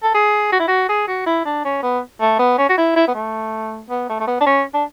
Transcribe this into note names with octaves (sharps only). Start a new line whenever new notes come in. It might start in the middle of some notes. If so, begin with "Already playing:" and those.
A4
G#4
F#4
E4
F#4
G#4
F#4
E4
D4
C#4
B3
A3
B3
C#4
F#4
E4
E4
B3
A3
B3
A3
A3
B3
D4
C#4
D4